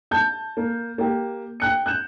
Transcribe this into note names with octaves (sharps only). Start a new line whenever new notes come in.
A5 G6
A#3
A#3 G4
G5 F#6 C#7
F#6 G6 E7